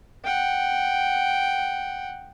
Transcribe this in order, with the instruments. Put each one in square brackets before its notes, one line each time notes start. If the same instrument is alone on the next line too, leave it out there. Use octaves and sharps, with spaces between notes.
[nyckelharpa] F#5 G5